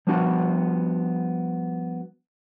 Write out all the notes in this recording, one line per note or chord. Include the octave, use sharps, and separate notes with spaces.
F3 G3 B3 D4 F#4